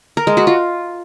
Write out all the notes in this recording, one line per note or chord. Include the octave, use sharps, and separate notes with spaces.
A#4
G#3
F#4
F4